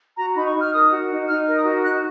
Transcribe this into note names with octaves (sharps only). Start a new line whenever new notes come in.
F#4 A#5
D#4 B5
C#6
D#4
F6
A#4 D#6
F#4
D#4
D#4 F6
A#4
D#6
F#4
D#4 F#6